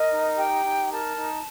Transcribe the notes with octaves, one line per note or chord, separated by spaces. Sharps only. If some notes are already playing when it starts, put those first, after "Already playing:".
Already playing: A#4 D#5
D#4
G4 G5
D#4
A#4 A5
D#4